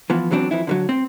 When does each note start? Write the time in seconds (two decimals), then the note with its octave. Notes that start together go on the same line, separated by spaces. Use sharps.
0.10 E3 F3 B3
0.31 E2 E3 F#3 C4 D4
0.51 F2 E3 E4
0.67 D3 D#3 F#3
0.89 C4